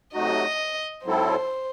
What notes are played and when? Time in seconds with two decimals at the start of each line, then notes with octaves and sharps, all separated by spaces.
0.14 C3 F#3 A3 D#4 F#4 D#5
1.04 G#2 F#3 C4 E4 A4 C5